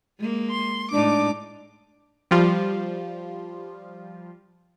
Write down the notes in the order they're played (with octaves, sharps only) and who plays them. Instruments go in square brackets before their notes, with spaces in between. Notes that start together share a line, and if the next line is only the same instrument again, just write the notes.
[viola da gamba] G#3 A#3
[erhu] C6
[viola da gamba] A2 G#3 D#4 [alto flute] D4 [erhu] D6
[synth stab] F3 G3 F4